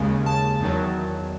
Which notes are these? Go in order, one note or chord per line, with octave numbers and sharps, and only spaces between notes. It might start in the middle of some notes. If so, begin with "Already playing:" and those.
Already playing: D#2 C#3 G#3 G#5
A5
E2 D#3 F#3